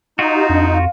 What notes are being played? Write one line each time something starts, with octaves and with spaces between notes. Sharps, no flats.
D#4 F4 F#4
G4
F2 D4
F5